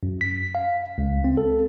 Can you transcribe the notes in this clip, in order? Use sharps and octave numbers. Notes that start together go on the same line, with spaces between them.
F#2
B6
F5
C#2
C4
A4